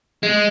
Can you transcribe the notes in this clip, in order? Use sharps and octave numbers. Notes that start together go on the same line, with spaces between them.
G#3